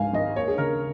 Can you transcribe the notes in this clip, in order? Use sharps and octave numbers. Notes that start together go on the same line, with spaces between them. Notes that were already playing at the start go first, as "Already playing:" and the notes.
Already playing: G#1 C#2 G#2 F5 G#5
G#1 D#5
D#2 C#5
G#4
C#3 A#4